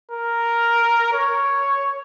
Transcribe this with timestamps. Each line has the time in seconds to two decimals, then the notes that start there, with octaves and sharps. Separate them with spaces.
0.11 A#4
1.13 C#5